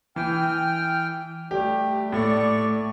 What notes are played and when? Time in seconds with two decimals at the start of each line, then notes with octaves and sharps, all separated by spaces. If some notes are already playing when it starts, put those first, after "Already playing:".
0.16 E3 G5 F6
1.51 G3 A3 G4
2.12 A2 D5 C#6